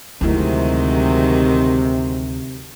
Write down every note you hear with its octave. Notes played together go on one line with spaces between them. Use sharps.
D2 C3 D#3 F#3 G#3 E4